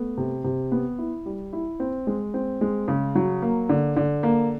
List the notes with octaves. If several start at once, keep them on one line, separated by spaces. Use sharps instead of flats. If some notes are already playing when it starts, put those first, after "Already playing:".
Already playing: A3 B3
C3
C3
B3
E4
G3
E4
C4
G#3
C4
G#3
C#3
F#3
A#3
D3
D3
A#3